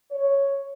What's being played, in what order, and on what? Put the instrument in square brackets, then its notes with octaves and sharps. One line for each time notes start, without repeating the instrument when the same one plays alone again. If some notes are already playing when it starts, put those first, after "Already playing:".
[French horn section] C#5